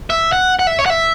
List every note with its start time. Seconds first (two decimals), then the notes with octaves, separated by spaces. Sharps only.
0.10 E5
0.33 F#5
0.59 F#5
0.67 E5
0.79 C#5
0.86 F#5
0.90 E5